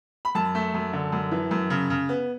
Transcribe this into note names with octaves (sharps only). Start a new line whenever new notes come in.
B5
F#2 A5
A3
F#2
D3
F#2
E3
F#2
C#3
C#3
B3